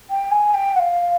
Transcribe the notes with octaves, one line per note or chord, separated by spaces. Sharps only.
G5
G#5
G5
F#5
F5